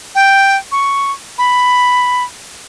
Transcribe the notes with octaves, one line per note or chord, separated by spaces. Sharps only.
G5
C#6
B5